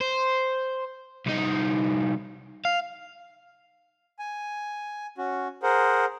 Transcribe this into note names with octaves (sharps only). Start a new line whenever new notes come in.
C5
C2 D#4
F5
G#5
C#4 F#4
G#4 A#4 C5 F#5